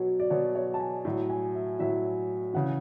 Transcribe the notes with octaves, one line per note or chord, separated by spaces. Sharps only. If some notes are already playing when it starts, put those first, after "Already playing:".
Already playing: B2 F#3 C#5
D5
B2 F#3 C#5
C#5
A5
G#5
A2 F#3
G#5
E5
A2 F#3 E5
C#3 E3 F#5